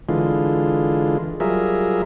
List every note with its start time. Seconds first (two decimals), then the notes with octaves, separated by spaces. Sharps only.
0.09 D3 E3 G#3 F4
1.40 F#3 G3 F4 G#4 A#4 E5